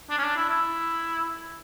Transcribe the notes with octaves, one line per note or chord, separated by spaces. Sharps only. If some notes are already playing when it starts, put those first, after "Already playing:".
D4
C#4
D4
E4
E4